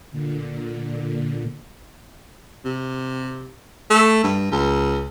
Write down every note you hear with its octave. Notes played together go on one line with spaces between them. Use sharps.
A#2 D3
C3
A3
G2
C#2